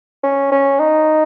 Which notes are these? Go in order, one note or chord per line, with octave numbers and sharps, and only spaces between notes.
C#4
C#4
D#4